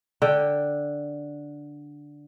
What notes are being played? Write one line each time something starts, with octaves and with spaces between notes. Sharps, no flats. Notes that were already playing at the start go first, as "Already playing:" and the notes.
D3 G5